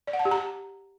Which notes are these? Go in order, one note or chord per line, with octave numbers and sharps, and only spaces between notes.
D5
F#5
A5
G4
A#5